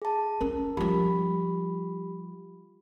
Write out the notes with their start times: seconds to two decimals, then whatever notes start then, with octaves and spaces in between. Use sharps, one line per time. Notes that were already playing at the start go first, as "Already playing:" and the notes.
0.02 G#4 A5
0.41 C#4 F4 A#4
0.77 F3 G3 F4 G4 B5